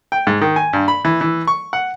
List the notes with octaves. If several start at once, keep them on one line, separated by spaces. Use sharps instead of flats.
G5
G#2
D#3
G#5
G2
B5
E3
E3
C#6
F#5